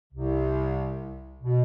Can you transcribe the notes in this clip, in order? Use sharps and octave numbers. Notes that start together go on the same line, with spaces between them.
C2 C3
B2